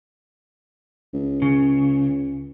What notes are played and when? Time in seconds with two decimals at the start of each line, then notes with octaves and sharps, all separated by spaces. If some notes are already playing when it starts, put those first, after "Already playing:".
1.13 C#2
1.42 C#3